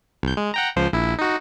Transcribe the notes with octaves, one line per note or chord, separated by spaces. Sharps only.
C2 G6
G#3
F#5 G5 A#5
C#2 F3 C5
A#1 E4
D#4 F#4